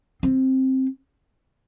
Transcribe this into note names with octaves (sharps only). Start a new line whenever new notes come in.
C4